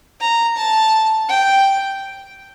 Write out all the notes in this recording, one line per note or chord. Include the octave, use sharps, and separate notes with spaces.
A#5
A5
G5